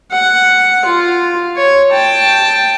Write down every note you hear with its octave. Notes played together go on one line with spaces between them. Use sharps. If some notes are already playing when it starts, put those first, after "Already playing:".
F#5
F4
C#5
G5 A5